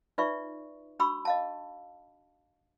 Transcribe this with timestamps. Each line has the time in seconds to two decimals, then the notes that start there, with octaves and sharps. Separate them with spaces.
0.18 D#4 F4 B4 D5 E5 C#6
0.99 D4 F#4 B5 C#6 E6
1.25 D#5 F5 A5